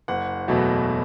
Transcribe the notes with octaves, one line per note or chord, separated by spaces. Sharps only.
F#1 F#5
E2 B2 F#3 A3